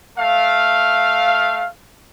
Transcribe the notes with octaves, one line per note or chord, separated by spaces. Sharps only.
A3 F5